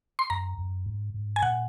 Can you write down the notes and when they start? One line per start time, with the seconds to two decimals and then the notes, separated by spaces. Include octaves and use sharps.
0.19 C6
0.30 F#2 A#5
0.58 F#2
0.86 G#2
1.14 G#2
1.36 G#5
1.42 A#2 F#5